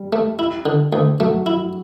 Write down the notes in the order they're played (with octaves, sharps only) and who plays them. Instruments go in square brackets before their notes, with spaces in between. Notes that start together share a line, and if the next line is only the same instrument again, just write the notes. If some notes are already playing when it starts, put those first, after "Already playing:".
Already playing: [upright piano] G3
[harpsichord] A3
E4
D3
D2
[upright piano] F#3 [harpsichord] A3
[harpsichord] E4